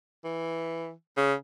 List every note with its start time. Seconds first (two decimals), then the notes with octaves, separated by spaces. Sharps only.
0.24 E3
1.17 C#3